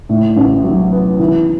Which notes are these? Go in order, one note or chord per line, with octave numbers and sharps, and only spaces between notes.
A2
A1
F#3
B3
E3